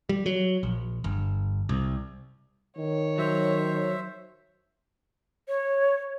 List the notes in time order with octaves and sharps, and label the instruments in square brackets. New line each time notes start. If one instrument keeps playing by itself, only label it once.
[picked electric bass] G3
F#3
A#1
G1
C2
[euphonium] D#3 [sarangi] C#5
[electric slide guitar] F#3 [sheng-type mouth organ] C5 E5
[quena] C#5